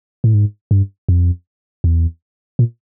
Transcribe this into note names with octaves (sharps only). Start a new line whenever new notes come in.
A2
G#2
G2
F2
E2
A#2